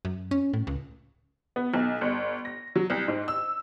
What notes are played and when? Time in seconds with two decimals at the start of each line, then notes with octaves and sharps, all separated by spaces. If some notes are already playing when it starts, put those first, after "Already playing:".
0.05 F#2
0.31 C#4
0.53 A2
0.67 C#2
1.56 B3
1.74 B1
2.01 G1
2.45 A#6
2.76 F#3
2.90 C2
3.08 G#2
3.28 E6